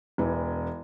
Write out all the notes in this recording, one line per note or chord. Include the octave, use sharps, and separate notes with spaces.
E1 E3